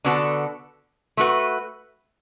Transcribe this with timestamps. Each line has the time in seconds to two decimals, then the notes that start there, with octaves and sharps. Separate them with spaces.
0.05 D3 B3 F#4 A4
1.17 A3 F#4 B4